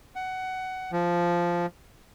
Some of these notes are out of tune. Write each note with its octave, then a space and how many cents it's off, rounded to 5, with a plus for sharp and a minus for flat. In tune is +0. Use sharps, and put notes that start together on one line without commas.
F#5 +15
F3 -5